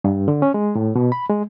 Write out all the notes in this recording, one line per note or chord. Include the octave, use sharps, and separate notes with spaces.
G2
D3
C#4
G#3
A2
B2
B5
G#3